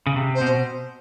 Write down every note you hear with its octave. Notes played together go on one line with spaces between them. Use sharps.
C#3
C3
C5
B2